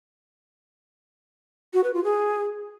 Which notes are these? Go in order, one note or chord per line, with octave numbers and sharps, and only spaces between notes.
F#4
B4
F4
G#4